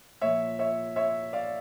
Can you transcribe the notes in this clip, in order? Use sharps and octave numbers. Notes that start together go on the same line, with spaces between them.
A#2 F3 C#5 E5
C#5 E5
C#5 E5
D5 F5